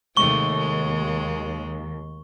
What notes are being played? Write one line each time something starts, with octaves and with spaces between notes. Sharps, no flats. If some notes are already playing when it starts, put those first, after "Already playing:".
D#2 C3 G#3 A3 C#6 G7
G#3